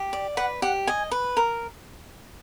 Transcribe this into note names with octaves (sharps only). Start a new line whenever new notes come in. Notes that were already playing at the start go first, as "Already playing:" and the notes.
Already playing: G4
D5
B4 F#5
G4 F#5
D#5 G#5
B4
A#4